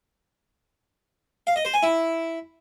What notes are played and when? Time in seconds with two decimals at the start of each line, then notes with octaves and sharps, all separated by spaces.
1.47 F5
1.56 D#5
1.65 C5
1.74 G#5
1.83 E4